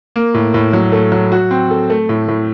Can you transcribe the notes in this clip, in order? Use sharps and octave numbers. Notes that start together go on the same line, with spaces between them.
A#3
A2
A2
F#3
A3
F#3
F#4
C4
A4
A3
A2
A2